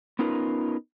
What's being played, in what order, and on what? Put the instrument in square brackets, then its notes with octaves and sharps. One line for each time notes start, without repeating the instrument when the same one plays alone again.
[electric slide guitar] B3 C#4 D#4 F4 A#4 B4